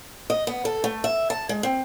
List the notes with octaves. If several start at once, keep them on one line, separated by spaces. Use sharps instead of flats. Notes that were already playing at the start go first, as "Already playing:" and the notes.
D#5
B3
A4
A3
E5
A5
G#3
C4